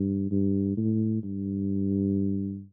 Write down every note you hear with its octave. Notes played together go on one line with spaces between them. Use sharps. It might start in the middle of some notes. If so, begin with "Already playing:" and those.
Already playing: G2
G2
A2
G2